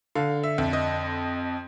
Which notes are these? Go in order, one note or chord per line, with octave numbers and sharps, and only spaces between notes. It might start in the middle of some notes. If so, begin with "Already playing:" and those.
D3 F5
E5
F2
D#5